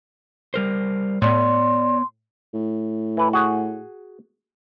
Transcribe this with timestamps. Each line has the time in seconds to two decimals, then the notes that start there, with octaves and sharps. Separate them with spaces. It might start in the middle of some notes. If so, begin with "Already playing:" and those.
0.54 G3 A#4 C5
1.22 A2 B3 C#5 D5 C6
2.54 A2
3.17 E3 B4
3.33 F#4 G#4 F#5